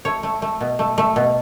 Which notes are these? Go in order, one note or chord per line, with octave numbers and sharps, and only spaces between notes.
A3 C#5
A3
A3
B2
A3
A3
B2